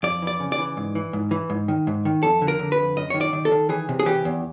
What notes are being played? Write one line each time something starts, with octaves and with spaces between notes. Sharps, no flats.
F2 D5
E3 D5
C#3
D5
E3
G#2
E3
G#2
E3
G#2
D#3
G#2
D#3
F2 A4
D3
A#4
D3
B4
F2
F#2 D#5
D#3 C#5
D5
D#3
A4
D#3
E3 G#4
C3
G#4
E3 G4
E2